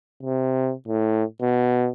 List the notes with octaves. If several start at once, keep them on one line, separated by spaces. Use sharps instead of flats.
C3
A2
B2